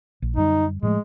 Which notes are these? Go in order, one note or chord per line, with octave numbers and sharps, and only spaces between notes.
A#1
F#2 D3 G3 D#4
A2 F3 G#3 A3